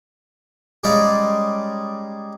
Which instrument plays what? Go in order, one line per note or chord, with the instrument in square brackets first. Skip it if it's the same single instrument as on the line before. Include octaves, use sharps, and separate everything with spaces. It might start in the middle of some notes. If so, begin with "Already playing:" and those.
[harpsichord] G3 G#3 C#4 D#4 D5 F5